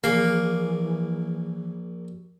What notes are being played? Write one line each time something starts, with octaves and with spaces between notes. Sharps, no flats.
A#1 E3 A#3 G#4 D6